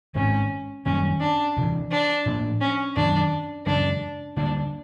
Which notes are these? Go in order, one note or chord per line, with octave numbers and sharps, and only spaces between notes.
G#2 D#3 G#3 C4 C#4
F#2 D#3 G3 A#3 C#4
D4
D2 C3 E3
D4
A2 F3 A#3 D4
C#4
F#2 D#3 F#3 D4
F#2 C#3 E3 G#3 D4
D2 D3 G3 A#3 D4